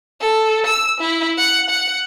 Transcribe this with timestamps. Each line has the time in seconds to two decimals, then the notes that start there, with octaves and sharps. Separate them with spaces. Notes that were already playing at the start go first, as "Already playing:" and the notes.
0.21 A4
0.66 E6
1.00 E4
1.38 F#5
1.70 F#5